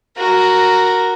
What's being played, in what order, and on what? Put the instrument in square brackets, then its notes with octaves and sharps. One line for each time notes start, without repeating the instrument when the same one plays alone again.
[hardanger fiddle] F#4 A#4